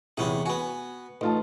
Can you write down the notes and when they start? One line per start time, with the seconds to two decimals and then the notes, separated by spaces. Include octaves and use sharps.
0.17 E2 C3 B3 C#4 G#4
0.46 B3 F#4 G#5
1.21 A1 D#4 F4 A5